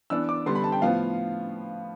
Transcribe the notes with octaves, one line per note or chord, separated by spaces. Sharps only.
E3 B3 D4 E6
D6
D3 G3 B3 C6
B5
A5
G5
A2 F3 B3 F5